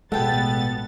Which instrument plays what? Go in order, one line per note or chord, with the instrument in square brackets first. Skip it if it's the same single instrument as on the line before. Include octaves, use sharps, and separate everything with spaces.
[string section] A1 B3 A6 [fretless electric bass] B2 G#3 [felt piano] A4 [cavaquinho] F#5 G5